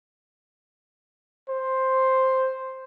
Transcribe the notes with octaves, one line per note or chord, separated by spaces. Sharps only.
C5